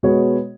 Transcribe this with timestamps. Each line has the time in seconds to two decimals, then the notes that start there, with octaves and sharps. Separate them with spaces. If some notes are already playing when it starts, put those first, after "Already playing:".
0.03 B2 G#3 B3 F#4 C#5